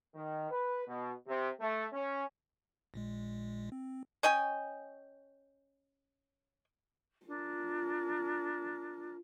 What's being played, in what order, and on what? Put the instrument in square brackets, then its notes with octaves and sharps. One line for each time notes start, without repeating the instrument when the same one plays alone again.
[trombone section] D#3
B4
B2
C3
A3
C#4
[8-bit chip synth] A#1 A#2 G#3
C4
[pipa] C#4 D#5 G5 G#5
[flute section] D4 A#4 [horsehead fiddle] F4